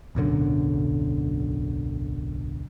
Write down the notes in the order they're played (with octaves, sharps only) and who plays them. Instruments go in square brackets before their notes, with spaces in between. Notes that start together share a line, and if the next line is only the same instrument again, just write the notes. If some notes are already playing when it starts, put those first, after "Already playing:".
[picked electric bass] D1 B1 F#2 D3